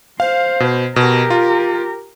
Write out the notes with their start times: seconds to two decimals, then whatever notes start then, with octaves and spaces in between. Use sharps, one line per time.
0.20 C5 F5
0.60 B2
0.96 B2 G4 A#4
1.30 F4